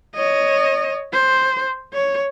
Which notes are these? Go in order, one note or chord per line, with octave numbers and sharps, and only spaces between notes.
C#5 D#5
C5
C#5